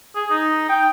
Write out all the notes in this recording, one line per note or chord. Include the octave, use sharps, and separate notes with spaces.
G#4
D#4
G5